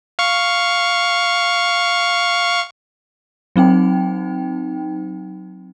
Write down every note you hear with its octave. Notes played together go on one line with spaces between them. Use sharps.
F5 C#6
F#3 C4 D#4 G5